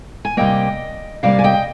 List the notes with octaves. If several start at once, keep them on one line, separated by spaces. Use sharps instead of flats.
G#5
C3 G3 A#3 D#5 G5
C3 G3 A#3 D5 F5
G#5
D#5 G5